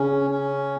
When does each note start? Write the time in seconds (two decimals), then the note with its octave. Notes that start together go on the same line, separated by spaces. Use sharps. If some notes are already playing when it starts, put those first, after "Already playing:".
Already playing: C#3 C#4
0.30 C#4